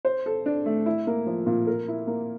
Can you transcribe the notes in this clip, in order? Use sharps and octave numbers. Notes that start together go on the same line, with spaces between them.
C5
A4
D4
A3
E4
A#3
F3
A#2
A#4
E4
A#3